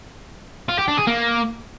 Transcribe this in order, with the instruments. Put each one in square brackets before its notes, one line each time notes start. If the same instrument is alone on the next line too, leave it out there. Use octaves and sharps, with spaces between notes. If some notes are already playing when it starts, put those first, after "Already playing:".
[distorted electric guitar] F4
G4
D4
G#4
A#3